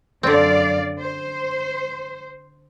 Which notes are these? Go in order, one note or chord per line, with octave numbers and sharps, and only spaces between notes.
F#2 D3 C4 D5 F5
C5